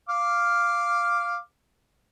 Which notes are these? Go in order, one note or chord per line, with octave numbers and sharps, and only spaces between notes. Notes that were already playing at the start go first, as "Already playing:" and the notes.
F5 D6 F6